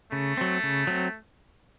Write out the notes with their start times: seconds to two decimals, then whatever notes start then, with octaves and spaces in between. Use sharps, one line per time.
0.12 C#3 A3
0.37 F#3 C4
0.63 C#3
0.87 F#3 C4